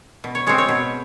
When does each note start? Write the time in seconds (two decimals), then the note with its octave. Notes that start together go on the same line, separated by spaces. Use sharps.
0.24 B2
0.35 C#5
0.47 G#3 C4 C#5
0.58 C#5
0.69 B2